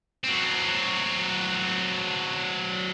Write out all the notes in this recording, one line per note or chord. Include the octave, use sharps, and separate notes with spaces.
F#3 C4